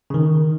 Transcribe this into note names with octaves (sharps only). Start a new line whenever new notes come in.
C#3
D#3